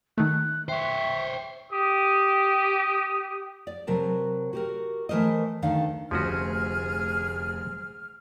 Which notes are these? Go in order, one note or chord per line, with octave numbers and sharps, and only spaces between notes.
D#3 A3 F#6
C5 C#5 E5 G5
G4 D#6
D5
C3 F#3 A#4 B4 A5
F#4 G4 A#4
E3 A3 A#4 C5 D#5
D2 D#3 D4 A4 F5
F1 D2 F3 C#4 F#4 G#4 F6